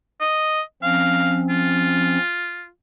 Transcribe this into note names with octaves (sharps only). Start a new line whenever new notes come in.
D#5
F3 C4 C#4 F5
F4